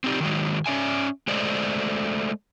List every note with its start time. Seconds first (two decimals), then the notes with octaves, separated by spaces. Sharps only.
0.04 C4 D#4 G4 D5
0.20 D#3 F#3 G#3
0.66 C#4 D5 E5 G#5
1.27 G#3 A3 C5 D5 D#5